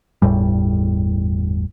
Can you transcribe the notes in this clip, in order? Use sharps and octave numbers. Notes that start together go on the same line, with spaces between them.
G1 E2 A2 G3